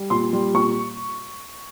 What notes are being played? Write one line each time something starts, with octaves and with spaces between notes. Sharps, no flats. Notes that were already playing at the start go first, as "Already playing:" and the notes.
Already playing: G3
A#2 C6
G3
A#2 C#6